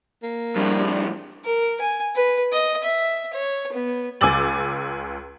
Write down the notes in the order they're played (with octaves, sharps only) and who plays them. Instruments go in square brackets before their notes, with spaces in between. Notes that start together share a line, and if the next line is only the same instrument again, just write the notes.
[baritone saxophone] A#3
[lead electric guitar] F2 A2 [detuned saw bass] G3 [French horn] D4
[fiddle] A#4
G#5
B4
D#5
E5
C#5
B3
[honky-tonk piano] C#2 G#5 D6 E6 A6 F#7